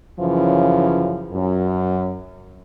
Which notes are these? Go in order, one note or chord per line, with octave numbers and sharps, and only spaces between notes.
F#2 C#3 E3 F3
F#2